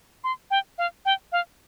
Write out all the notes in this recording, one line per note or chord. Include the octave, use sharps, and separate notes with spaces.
C6
G5
F5
G5
F5